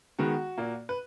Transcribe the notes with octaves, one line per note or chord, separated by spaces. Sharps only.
D#3 G#3 B3 F#4
A#2 A#3
B4